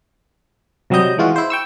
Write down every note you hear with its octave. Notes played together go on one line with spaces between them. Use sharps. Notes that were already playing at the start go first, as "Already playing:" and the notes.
C3 F#3 G3 D#5 G6
E3 G#3 F4 F#4
E4 C5
G5 C#6 E6